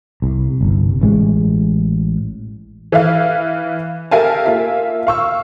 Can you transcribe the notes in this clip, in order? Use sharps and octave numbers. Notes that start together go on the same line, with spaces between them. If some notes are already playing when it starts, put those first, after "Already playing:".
C2
G1 C2
A1 A2 G#3
E3 E5 F5
G4 A#4 E5 F5 G#5 A5
A#3 F4 E5
F5 C#6 E6